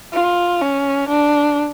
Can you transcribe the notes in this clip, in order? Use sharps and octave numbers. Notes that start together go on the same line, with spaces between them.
F4
C#4
D4